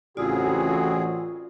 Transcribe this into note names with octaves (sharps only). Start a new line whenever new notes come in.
A1 C#3 C4 F4 F#4 G#4 D5